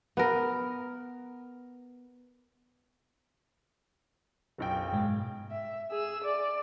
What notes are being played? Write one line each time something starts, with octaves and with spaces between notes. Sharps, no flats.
B3 A#4
F#1 B1 G5
G#2 B2 G#3
E5
G#4 E6
D5